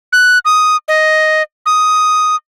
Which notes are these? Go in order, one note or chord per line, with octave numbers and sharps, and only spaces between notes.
F#6
D#6
D#5
D#6